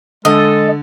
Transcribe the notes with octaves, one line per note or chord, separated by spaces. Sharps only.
D3 G#3 A4 D#5